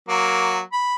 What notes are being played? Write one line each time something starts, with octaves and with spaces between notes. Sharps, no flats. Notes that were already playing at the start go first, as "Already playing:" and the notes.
F#3 A#3
B5